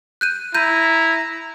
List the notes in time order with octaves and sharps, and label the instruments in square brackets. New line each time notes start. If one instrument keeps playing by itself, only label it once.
[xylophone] F#6 G6 D#7
[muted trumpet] E4 [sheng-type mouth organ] A#5 [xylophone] G6 D#7